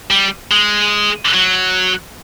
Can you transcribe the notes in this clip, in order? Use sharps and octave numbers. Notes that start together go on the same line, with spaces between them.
G3
G#3
F#3